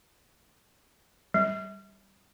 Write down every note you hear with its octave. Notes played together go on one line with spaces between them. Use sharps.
G3